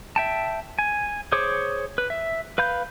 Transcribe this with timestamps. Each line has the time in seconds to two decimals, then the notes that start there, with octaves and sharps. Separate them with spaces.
0.16 E5 G5 A5
0.79 G#5
1.32 G#4 C5 C#5 D6
1.98 B4
2.10 E5
2.58 B4 F5 B5 G6